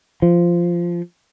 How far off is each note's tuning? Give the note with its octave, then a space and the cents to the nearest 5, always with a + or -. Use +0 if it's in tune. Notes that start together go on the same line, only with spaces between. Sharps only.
F3 -10